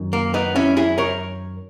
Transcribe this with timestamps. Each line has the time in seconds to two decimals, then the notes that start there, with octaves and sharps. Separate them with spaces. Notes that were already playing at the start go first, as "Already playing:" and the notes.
Already playing: F#2 D#3
0.13 A#3
0.34 B3 D#4
0.56 C#4 E4
0.77 E4 G#4
0.98 A#4 C#5